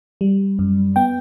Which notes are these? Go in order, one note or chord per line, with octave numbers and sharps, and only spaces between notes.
G3
F#2
B3 G5